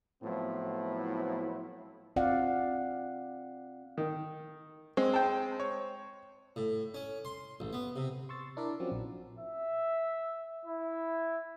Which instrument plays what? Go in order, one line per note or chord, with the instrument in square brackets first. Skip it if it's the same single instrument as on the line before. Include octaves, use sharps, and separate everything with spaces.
[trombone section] A2 F3 F#3 B3 C4 E4
[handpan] C4 F4 D5 F5 F#5
[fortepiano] D#3
[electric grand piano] G#3 [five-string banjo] C4
[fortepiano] G5 A5
[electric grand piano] C#5
[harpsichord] A2
C#4
C6
A1
B3
C3
[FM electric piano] C6 C#6 E6 A6
D4 E4 A#4 D5 E5
F3 F#3 C4 C#4 F#4
A#1
[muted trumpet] E5
E4